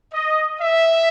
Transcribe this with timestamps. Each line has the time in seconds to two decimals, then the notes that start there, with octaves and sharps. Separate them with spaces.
0.13 D#5
0.61 E5